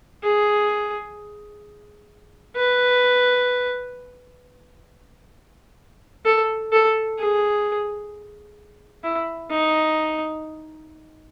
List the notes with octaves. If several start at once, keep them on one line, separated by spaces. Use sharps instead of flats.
G#4
B4
A4
A4
G#4
E4
D#4